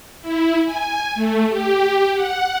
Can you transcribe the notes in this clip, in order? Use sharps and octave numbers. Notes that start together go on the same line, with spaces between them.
E4
G#5
A3
G4
F#5